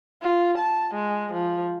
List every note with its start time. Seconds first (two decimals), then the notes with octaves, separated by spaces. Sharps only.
0.22 F4
0.58 A5
0.95 G#3
1.33 F3